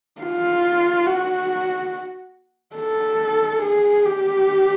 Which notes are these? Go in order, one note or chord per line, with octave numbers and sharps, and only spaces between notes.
F4
F#4
A4
G#4
G4